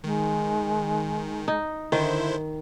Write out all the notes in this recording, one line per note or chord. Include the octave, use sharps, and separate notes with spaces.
D#3 G#3
D#4
D3 D#3 E4 C5